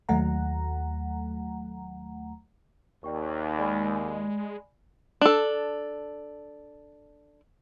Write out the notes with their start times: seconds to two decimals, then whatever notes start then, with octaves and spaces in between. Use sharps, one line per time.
0.09 D#2 F#3 A3 F#5 A#5
3.04 D#2 D5 G5 C#6
3.59 G#3 D5 G#5 B5
5.21 D4 A4